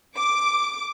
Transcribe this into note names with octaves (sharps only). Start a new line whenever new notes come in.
D6